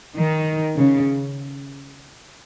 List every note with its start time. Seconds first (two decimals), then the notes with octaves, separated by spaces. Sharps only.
0.15 D#3
0.78 C#3